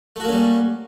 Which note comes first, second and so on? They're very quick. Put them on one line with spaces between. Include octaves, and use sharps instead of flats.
A3 F#4 A#3 C#4 G3